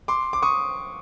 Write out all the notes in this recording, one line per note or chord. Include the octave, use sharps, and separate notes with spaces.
C6 D6
D6
C#6 D#6